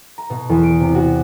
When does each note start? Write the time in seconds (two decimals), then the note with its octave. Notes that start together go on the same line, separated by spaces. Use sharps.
0.18 A#5
0.30 B2
0.49 E2
0.63 D7
0.80 C3
0.95 F#4